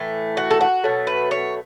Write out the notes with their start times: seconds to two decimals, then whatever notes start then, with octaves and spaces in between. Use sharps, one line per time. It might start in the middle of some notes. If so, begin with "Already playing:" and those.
Already playing: A2 E3 A3
0.37 F#4
0.51 A4
0.61 F#4
0.84 B2 F#3 A3
1.07 B4
1.31 C#5